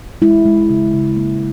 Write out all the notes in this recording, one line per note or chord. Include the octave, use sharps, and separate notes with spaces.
G#3 E4
G#3
C#3
C#3
A#3